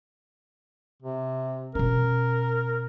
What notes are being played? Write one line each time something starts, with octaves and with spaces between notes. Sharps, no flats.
C3
B2 C#4 A#4